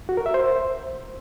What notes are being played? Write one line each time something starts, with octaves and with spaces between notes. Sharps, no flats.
F#4
A#4
E5
C5